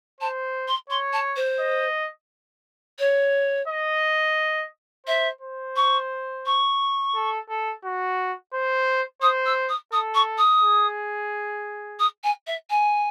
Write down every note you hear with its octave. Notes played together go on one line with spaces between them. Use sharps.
C5 A5
C6
C#5 C6
A5
C5
D#5
C#5
D#5
C5 E5
C5
C#6
C#6
A4
A4
F#4
C5
C5 D#6
E6
D#6
A4 D#6
C#6
D#6
G#4
D#6
G#5
E5
G#5